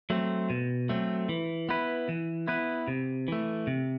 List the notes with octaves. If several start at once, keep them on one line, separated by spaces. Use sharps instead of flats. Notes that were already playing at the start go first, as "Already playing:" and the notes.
F#3 A3 C4
B2
F#3 A3 C4
E3
B3 E4 B4
E3
B3 E4 B4
C3
E3 A3
C3